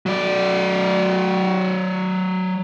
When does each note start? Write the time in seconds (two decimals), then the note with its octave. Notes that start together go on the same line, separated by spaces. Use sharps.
0.06 F#3 D5